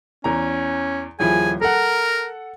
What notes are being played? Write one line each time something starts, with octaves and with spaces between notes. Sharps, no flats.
E2 C#4 A#5
D#1 F3 E4 G#4 G#5
A4 A#4 F#5 A#5